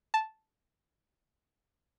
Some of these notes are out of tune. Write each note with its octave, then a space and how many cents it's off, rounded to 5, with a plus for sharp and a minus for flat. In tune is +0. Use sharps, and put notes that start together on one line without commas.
A5 -5